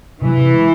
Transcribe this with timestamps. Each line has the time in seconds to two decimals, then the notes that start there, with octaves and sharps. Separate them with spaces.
0.22 C3 E3
0.37 C3
0.53 G#3